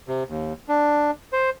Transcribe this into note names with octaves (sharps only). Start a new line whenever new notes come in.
C3
D#2
D4
C5